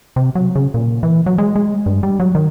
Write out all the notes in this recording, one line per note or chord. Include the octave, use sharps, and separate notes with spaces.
C3
F#3
C#3
A#2
E3
F#3
G#3
G#3
G2
G3
F#3
D#3